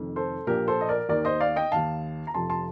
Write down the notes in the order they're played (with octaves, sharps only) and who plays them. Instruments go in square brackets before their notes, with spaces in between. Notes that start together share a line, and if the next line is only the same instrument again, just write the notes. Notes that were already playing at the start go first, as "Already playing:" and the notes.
Already playing: [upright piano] F1 F2 D#3
A4 C5
A#1 A#2 F3 G4 A#4
A4 C5
D#5
A#4 D5
D#2 D#3 A#4 D5
C5 D#5
D5 F5
D#5 G5
D#2 D#3 F5 A5
A#5
F1 F2 C3 F3 A5 C6
A5 C6